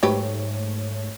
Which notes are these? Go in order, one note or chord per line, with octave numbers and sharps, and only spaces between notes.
G#2 F#3 A3 G4 B4 C#5